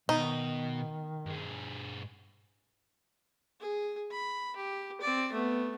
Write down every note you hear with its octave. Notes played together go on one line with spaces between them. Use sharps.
B2 D#3 D#4
G2 G#4
G#4
B5
G4
C4 D5
A3 B3